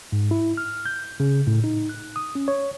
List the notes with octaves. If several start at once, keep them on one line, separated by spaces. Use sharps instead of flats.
G#2
E4
F6
G6
C#3
A2
D#4
F#6
D#6
C#4
C#5